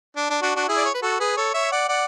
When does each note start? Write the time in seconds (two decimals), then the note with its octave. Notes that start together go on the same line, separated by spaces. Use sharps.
0.17 D4
0.30 D4
0.42 D4 F#4
0.56 D4 F#4
0.68 E4 G#4
0.77 D5
0.85 C#5
0.94 B4
1.03 F#4 A4
1.20 G#4 B4
1.37 A4 C#5
1.54 C#5 E5
1.72 D5 F#5
1.89 D5 F#5